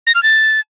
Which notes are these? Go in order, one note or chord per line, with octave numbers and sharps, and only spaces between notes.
A#6
F6
A6